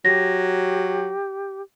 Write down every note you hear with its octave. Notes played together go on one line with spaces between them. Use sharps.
F#3 G4 A#6